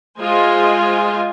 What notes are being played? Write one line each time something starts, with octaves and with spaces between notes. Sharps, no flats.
G#3 F4 G#4 C5 D#5 G#5